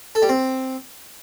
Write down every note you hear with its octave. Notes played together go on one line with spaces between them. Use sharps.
A4
G3
C4